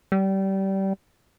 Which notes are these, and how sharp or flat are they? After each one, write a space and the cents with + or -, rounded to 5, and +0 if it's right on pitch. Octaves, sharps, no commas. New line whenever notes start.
G3 -25